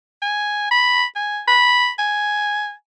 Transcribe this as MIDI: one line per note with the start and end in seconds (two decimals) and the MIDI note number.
0.22 0.71 80
0.71 1.04 83
1.16 1.40 80
1.47 1.89 83
1.98 2.72 80